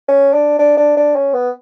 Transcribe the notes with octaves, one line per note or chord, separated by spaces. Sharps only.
C#4
D4
D4
D4
D4
C#4
B3